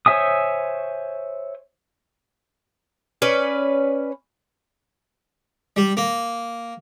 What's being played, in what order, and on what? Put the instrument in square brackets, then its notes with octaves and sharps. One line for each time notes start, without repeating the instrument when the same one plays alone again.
[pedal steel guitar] C5 C#5 E5 G#5 D#6
[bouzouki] C#4 B4 D5
[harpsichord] G3
A#3